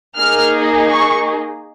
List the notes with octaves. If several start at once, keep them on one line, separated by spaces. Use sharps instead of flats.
A#3 D#4 G#4 F6
C#6